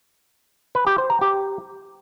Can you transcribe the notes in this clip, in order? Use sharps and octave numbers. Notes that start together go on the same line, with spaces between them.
B4
G4
C5
A#5
G4